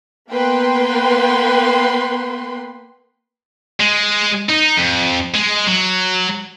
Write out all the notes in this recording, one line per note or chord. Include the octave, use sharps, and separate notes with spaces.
A#3 B3 B4 G5 C6
G#3
D#4
F2
G#3
F#3